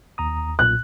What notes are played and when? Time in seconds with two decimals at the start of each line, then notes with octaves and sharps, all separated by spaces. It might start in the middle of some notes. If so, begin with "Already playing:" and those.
0.18 D#2 A#5 D#6
0.59 B1 A#2 F#6